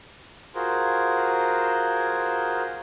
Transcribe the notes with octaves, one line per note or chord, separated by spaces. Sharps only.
F4 F#4 G#4 A#4 C5